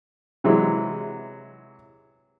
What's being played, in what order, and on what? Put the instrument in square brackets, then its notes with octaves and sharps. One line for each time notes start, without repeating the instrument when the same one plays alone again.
[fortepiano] C3 E3 F#3 G#3